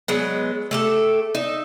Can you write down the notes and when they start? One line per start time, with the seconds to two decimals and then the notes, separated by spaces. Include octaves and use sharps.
0.08 F#3 G#3 B3
0.71 A3 G4 A4
1.35 D#4 E5